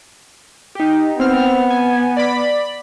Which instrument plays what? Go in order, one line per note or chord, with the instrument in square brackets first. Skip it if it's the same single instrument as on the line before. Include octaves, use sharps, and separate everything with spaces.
[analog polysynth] D#4 G4
[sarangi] B3 [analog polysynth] C4 F6
[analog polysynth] G#5
D5 B5